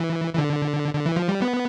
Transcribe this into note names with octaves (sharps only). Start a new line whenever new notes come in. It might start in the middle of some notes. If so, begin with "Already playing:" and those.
Already playing: E3
E3
D3
D3
E3
F3
G3
B3